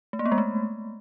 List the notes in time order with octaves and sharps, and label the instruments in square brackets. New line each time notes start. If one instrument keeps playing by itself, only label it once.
[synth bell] A3
A#3
B3
G#3
A3